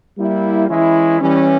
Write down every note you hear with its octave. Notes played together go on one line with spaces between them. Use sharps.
G3 A#3 E4
E3 G#3 C#4 E4
E3 G3 C#4